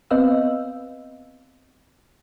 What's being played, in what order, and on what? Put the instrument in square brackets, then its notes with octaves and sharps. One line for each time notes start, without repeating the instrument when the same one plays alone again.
[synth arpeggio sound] B3 C4 B4 D#5 F5 E6